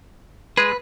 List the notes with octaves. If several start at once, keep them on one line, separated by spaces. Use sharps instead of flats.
G#3 G#4 B4